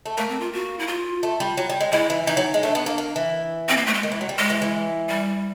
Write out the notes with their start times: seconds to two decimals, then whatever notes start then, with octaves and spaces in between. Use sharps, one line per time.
0.06 A3
0.18 A3 A#3
0.29 C4
0.40 F4
0.53 F#4
0.79 E4
0.87 F4
1.23 A3
1.40 G3
1.57 F#3
1.70 G3
1.81 G#3
1.92 G#3 E4
2.10 E3
2.27 E3 D#4
2.37 F#3
2.54 G#3
2.63 A3 D4
2.75 B3
2.86 A#3
2.98 A#3
3.16 E3
3.69 C4
3.77 A#3
3.86 A3
3.94 G#3
4.03 D#3
4.12 E3
4.21 F#3
4.29 G3
4.38 G#3
4.50 E3
4.62 E3
5.09 G3